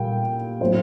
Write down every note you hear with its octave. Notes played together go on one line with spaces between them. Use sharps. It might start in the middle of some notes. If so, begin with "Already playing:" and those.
Already playing: A#2 G3 G5
A2 F#3 A#3 C5